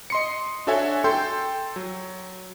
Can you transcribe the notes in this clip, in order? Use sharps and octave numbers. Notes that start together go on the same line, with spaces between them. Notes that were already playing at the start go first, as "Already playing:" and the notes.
D#5 C6 C#7
D4 F#4 A4 C#5 E5 G#5
A4 G5 C6 G6
F#3